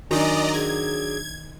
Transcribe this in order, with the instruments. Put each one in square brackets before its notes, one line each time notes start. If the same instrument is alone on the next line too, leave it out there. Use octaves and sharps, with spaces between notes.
[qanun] D#3 D#4 [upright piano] F#3 D4 [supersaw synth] D5 D#5 A#5 [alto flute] G#5
[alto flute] G#4 [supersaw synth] G#6